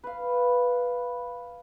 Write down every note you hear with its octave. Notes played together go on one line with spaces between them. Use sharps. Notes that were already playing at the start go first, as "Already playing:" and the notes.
B4 F5